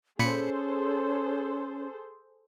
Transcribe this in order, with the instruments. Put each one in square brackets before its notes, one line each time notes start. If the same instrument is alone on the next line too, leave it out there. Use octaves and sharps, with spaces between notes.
[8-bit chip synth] A#2 B5 C#7 [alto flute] C#4 [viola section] G#4 A4 C5